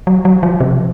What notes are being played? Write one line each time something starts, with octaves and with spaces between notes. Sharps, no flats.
F#3
F#3
F3
C3